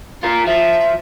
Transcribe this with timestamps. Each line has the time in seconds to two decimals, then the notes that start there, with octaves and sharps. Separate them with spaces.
0.23 F4 A#4
0.47 F3 E5